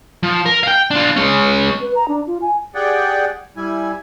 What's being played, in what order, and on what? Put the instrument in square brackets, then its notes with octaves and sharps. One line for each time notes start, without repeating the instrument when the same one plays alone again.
[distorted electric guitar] F3
A#4
F5 G5
D4 F4
G#3 C#4
[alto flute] B4
A#5
D4
F4
G#5
[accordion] G4 G#4 D5 F#5 G5
G3 E4 G#5